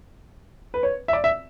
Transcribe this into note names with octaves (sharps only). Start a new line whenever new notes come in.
B4
C#5
E5
D5
E5